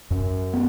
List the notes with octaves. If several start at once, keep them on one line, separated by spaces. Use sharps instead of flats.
F#2
B3